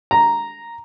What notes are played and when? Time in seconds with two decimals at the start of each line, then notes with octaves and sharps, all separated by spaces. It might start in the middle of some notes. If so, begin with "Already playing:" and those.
0.11 A#5